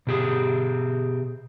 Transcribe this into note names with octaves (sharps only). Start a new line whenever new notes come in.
B2 G4 G#4